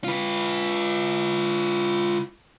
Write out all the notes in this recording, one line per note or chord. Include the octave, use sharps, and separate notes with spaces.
F4 B4